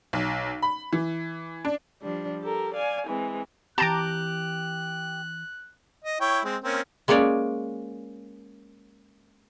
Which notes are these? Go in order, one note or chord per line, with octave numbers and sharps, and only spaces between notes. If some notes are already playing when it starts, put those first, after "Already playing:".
B1
B5
E3
D4
F3 G3 D4
G4 A4 A#4
D5 F5 G#5
E3 G#3 C4
E3 C4 G4 A5 A#5 D6 F#6
D#5
E4 C#5 G5
G#3 C4
A#3 C4 C#4
G#3 A#3 C#4 C#5 D5